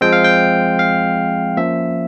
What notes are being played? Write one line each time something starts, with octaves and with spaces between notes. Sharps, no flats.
F3 G#3 C4 G5
F5
G5
F5
F3 A#3 C#4 E5